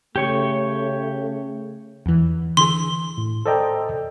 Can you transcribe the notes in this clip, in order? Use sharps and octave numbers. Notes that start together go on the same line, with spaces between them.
C#3 A3 G4 C#5 C#6
E2 E3
D3 E3 G#4 C6
A2
A4 C5 D5 D#5 G5 A#5